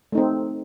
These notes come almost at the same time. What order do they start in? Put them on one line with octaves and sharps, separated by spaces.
A3 D#4 C4